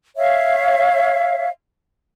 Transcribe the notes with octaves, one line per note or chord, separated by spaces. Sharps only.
C#5 E5 F5